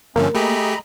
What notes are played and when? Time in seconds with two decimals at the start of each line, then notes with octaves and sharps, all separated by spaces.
0.16 G2 D3 F3 A3 A#3 C4 C#4
0.35 A3 G4 G#4 D#5 A#5 B5